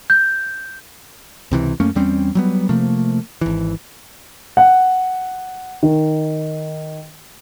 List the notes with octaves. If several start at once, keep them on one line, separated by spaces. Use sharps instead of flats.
G6
C#2 C3 E3
F#2 A3 A#3 C#4
E2 G3 C4 C#4
F#3 G3 B3
C3 F3 A3 A#3
G#1 E3
F#5
D#3